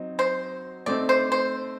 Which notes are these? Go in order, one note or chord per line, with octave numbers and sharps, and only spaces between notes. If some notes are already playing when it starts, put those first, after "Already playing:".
Already playing: F#3 C4 D#4
C5
A3 C4 D#4 D5
C5
C5